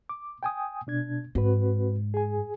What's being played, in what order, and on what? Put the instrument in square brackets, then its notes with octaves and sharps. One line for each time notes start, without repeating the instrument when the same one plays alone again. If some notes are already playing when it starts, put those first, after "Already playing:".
[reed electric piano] D6
G5 G#5 D#6
B2 D4 G#6
[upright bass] G#2 [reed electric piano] C4 F#4 B4
[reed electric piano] G#4 G#5